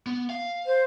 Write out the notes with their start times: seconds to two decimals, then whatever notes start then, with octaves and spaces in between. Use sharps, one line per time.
0.06 B3
0.30 F5
0.66 C5